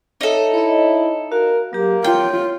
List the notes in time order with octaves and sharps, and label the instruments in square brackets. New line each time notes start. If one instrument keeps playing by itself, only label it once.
[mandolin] D#4 A4 [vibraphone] C#5 E5
[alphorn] E4 [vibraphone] C#5 D#5
[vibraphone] F#4 F5 [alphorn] A#4
[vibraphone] F#3 G4 [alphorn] A#3
[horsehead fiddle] F4 [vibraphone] C#5 [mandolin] G5